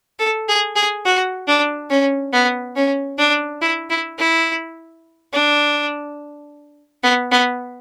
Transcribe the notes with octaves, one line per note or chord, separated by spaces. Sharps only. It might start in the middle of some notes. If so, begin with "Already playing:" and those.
A4
G#4
G#4
F#4
D4
C#4
B3
C#4
D4
E4
E4
E4
D4
B3
B3